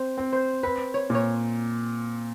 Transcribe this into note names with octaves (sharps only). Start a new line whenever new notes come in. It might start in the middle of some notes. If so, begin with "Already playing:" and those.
Already playing: C4 C5
C4
C5
C4 B4
C#5
A#2
C#5